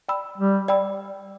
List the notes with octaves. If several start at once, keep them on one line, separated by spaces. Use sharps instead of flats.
D5 G5 B5 E6
G3
D5 G5 B5 E6